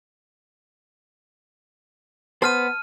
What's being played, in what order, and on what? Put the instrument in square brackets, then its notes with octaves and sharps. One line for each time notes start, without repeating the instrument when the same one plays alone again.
[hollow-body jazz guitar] B3 C5 [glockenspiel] A5 F6 D#7